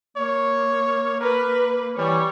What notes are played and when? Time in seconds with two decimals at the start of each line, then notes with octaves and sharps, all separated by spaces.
0.17 A#3 C#5
1.21 A#4 B4
1.98 E3 G3 C#5